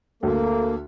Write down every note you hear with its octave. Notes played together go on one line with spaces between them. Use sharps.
D2 A#3 A4